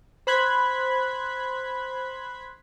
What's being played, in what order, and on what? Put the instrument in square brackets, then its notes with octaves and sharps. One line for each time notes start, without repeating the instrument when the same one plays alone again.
[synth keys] C5 B5 F#6 G#6 B6